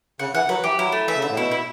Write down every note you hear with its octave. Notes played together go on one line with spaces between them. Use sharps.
C#3 F#5
E3 F#5
F#3 B4
E3 G4
F#3 E4
A3
E3 E5
C#3
D3 E5
A2
B2 E4
E4